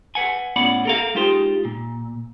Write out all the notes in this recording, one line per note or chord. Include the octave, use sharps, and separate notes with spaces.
B4 F#5 G#5
A2 B3 C#4 D5 F#5 B5
A4 A#4 F5
G#3 D#4 F4 G4 C5
A#2